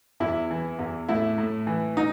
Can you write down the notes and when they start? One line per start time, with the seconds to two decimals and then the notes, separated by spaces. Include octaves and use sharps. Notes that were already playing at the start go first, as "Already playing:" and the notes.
0.20 E2 E4
0.50 E3
0.79 E2
1.08 A2 E4
1.38 A2
1.67 E3
1.97 D#4